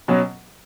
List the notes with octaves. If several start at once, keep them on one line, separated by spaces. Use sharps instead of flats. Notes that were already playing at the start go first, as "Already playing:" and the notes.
B2 F#3 C#4